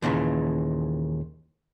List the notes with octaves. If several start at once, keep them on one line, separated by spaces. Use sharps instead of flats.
D#2 A#2 C#3 E3